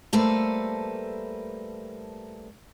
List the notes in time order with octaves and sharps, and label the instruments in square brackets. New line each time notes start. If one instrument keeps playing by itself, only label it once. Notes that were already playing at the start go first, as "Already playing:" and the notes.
[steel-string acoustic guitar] G3 A3 A#3 A4 B4 C5